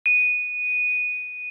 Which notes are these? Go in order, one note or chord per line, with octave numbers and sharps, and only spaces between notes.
D#7